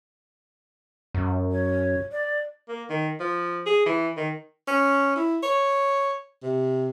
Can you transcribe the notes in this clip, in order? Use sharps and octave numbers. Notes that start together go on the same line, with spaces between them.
F#2
C#5
D5
A#3
D#3
F3
G#4
E3
D#3
C#4
E4
C#5
C3